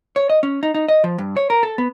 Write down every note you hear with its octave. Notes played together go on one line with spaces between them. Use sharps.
C#5
D#5
C#4
D#4
D#4
D#5
F3
G2
C#5
A#4
A4
B3